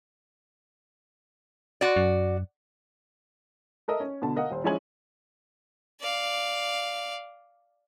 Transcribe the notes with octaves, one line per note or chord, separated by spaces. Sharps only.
F#4 D5
F#2
A4 A#4 D#5 E5
C#4
B2 D3 A5
A#4 D#5 F5 F#5
D#1 C5
F3 G#3 C#4 E4 G#5 F#7
D5 F5